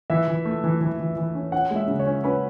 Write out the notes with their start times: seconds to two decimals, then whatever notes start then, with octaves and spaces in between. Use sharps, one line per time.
0.10 E3 E5
0.28 E3
0.45 A3
0.64 E3
0.81 E3
1.00 E3
1.16 E3
1.35 C#4
1.52 C#4 F#5
1.71 G#3
1.76 E5
1.88 C#3
1.99 C#5
2.07 C#4
2.23 C#4 B4